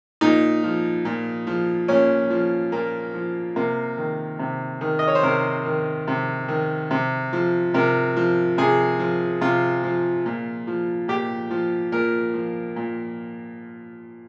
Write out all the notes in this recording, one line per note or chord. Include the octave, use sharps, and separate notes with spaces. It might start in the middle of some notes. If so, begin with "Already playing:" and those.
A#2 D#4
F3
A#2
F3
A#2 C#4
F3
A#2 A#3
F3
C3 A#3
D#3
C3
D#3
D#5
C#5
C5
C3 A#4
D#3
C3
D#3
C3
F3
C3 A#4
F3
C3 G#4
F3
C3 F4
F3
A#2
F3
A#2 G4
F3
A#2 A#4
F3
A#2